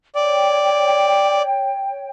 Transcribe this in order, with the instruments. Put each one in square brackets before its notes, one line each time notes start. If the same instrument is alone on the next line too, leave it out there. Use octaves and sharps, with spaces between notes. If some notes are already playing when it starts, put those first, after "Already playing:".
[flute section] C#5 G5 [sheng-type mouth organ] D5